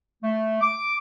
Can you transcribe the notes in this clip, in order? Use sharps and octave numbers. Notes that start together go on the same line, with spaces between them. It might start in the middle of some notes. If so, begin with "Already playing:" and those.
A3
D6